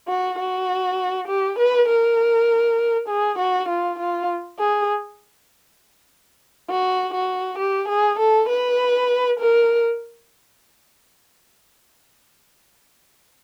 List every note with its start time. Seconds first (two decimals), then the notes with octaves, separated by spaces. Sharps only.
0.08 F#4
0.39 F#4
1.28 G4
1.59 B4
1.88 A#4
3.08 G#4
3.39 F#4
3.69 F4
3.99 F4
4.59 G#4
6.69 F#4
7.14 F#4
7.59 G4
7.88 G#4
8.19 A4
8.49 B4
9.39 A#4